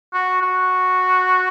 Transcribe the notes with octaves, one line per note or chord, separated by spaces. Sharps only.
F#4
F#4